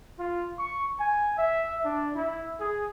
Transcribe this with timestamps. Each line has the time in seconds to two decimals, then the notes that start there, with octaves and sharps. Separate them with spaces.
0.19 F4
0.59 C#6
1.00 G#5
1.39 E5
1.85 D4
2.16 E4
2.60 G#4